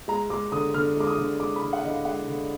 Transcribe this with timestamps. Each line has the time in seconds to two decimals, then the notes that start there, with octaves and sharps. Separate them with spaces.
0.08 G#3 A#5
0.30 G#3 D6
0.52 D3 D#6
0.74 D3 F6
0.97 G#3 D6
1.07 D#6
1.18 D3
1.40 G#3 D6
1.56 B5
1.62 D3
1.73 F#5
1.83 D3 D#5
1.89 F5
2.05 G#3 F#5
2.28 D3